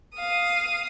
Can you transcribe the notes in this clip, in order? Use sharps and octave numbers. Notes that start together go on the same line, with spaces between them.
F5 D#6